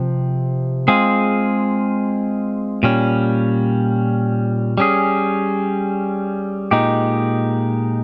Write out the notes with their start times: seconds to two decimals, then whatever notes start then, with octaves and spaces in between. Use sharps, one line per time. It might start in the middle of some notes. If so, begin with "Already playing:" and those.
Already playing: C3 F3 C4
0.88 G#3 C4 F4 G#4
2.83 A#2 G3 C#4
4.78 G3 C#4 G#4
6.71 A#2 G#3 D#4 G4